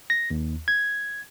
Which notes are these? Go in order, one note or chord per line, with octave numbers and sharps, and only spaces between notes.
A#6
D#2
G#6